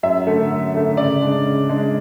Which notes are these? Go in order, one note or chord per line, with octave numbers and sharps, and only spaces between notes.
F#2 E5
D3 A3
F#2
D3 A3
C#3 D5
G#3 D4
C#3
G#3 D4